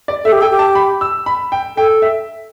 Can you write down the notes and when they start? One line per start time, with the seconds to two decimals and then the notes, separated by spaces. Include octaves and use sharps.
0.08 D5
0.25 A4 E5
0.32 G4
0.41 A4 G5
0.51 G4
0.59 A5
0.75 B5
1.01 E6
1.26 B5
1.52 G5
1.77 A4 G5
2.02 E5